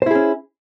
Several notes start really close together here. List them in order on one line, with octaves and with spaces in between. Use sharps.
C5 E4 G#4 C#4